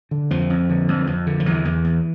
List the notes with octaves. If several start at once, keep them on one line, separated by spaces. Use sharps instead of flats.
D3
F2 F3
F2
D3
F2
F2
D3
F3
E2 E3
E2
E2